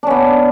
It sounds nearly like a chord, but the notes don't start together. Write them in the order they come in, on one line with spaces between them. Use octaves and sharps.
D4 C#4 B3